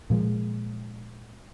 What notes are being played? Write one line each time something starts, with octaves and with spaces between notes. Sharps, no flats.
A#2 F3 G#3